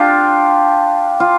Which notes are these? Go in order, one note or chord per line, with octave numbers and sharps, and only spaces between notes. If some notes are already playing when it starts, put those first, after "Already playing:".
Already playing: D4 F4 G4
F4